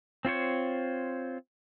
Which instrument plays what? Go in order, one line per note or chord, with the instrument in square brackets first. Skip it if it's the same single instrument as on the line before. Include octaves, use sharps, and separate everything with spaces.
[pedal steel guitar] C4 F4 C5 C#5